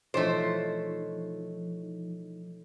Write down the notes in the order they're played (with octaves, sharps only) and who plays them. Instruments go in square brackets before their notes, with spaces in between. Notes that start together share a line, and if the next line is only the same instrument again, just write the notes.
[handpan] B2 E3 C#5 [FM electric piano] F3 D#4 [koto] A3 D4 [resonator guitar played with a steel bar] C5